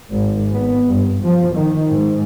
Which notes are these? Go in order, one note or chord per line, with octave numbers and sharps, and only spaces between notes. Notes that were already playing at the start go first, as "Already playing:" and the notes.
G#1
B3
G2
F3
D#3
G#2